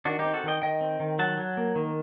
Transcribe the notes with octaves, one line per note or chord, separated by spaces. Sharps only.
D#3 D4 F#4
D#4 G4
C4
F#4 A4
D#3 D#5 G5
D#3 D#5 G5
C4
D#3
F#3 F#5 A5
F#3
A#3
D#3